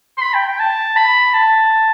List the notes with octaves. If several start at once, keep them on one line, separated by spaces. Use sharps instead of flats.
C6
B5
G5
G5
A5
B5
A5